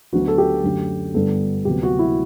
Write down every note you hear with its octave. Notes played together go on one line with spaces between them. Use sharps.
D2 D3 F#3 B3 F#4
A4
G4
F#2 D3 A3
G1 G2 D3 G3 B3 A4
D2 C3 F#3 B3 G4
F#4
E4